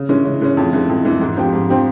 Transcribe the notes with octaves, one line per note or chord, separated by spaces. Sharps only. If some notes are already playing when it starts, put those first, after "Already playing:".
Already playing: C#3
E3 G#3 C#4
C#3
E3 G#3 C#4
F2
E3 G#3
F2
E3 G#3
G#2
F3 C4 G4
G#2
F3 C4 G4